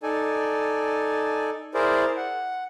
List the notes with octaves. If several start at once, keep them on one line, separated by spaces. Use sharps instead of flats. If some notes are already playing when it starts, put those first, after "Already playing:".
D#4 A4 D5 G#5
E4 G#4 A#4 C5 D5
F#5